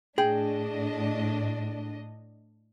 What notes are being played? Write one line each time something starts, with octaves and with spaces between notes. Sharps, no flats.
A2 D4 G#4 D#5 G5